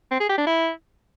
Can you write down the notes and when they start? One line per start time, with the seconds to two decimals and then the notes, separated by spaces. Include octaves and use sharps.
0.12 C4
0.21 G#4
0.29 G4
0.38 D4
0.47 E4